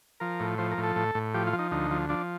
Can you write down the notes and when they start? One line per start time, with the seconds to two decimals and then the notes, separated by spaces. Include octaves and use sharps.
0.20 F3 A#4
0.40 A2
0.58 F3 C5
0.71 A#4
0.78 A2
0.83 A4
0.96 A2
1.15 A2
1.34 F3 G4
1.47 F4
1.53 F3
1.59 D#4
1.71 D2 D#4
1.91 F3
2.09 F3 D4